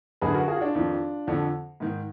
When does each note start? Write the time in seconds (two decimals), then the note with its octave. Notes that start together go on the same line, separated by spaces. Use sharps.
0.21 F#2 D3 G#4 B4
0.34 F#4 A#4
0.48 F4 G#4
0.56 F#4
0.61 D4 F4
0.75 F2 D#3
1.27 F2 D3
1.80 G#2 D#3